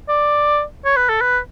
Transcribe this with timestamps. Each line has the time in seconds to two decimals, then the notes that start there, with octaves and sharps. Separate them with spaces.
0.09 D5
0.85 C#5
0.96 B4
1.09 A4
1.21 B4